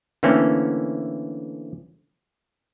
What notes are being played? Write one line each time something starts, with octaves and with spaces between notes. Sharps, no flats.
D3 E3 A3 A#3 C4 C#4